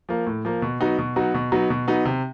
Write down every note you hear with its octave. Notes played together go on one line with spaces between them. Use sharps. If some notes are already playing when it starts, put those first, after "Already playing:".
F3 A#3
A2
F3 A#3
B2
F#3 B3 D#4 F#4
B2
F#3 B3 D#4 F#4
B2
F#3 B3 D#4 F#4
B2
F#3 B3 D#4 F#4
C3